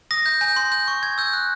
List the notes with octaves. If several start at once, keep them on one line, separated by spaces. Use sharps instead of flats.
D#6 A#6
G6
G#5 G6
C6
G6
C#6
C#6 G#6
E6 G6
F#6